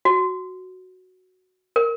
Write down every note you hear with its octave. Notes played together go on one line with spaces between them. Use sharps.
F#4
A#4